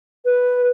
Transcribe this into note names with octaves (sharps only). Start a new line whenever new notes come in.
B4